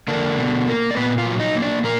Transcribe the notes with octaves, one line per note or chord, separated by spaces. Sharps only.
D3 A#3 D4
B2
A#3
D5
A#2 B3 B4
F4 F5
F#3
D#4 D#5
A#3
D4 D5
A#2 A#3 A#4